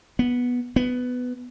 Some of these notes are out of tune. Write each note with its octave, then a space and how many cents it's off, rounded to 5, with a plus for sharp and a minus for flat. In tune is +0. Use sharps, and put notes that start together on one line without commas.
B3 -10
B3 +10